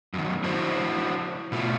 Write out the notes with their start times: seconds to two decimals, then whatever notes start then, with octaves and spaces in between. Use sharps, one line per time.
0.13 F#2 C3 D#3
0.44 D4 E4 F#4 C5
1.52 B2 A3 F4